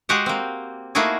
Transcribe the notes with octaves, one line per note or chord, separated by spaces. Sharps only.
G#3 F#4 G4 F5 F#5
A#3 C4
A3 A#3 D#4 E4 F#4 G#4